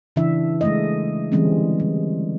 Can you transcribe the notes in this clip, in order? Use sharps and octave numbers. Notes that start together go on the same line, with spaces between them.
C#3 E3 D4 E4 E5
G#3 A3 D#5
D3 E3 G3 G#3 C4 C#4
G3